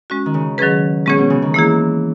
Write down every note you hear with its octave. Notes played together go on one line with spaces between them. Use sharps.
G#3 C#4 F#4
D#3
C#3
D#3 F#3 C#4 G#4 B4
B2 G#3 C#4 G#4 C#5
B2
C#3
D#3
E3 A#3 E4 G#4